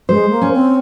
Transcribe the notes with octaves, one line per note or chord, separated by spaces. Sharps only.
G#3 C5
A#3
C#4
C4